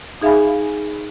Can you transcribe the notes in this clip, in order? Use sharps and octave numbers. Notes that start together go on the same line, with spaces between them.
D#4 G#4 E5 F5 G#5 B5